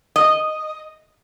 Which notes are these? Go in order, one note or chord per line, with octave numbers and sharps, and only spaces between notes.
D#5